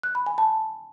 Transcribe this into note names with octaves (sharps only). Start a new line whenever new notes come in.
F#6
B5
G#5
A5